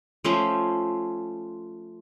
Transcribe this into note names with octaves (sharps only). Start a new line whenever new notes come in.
F3 A3 C#4 C5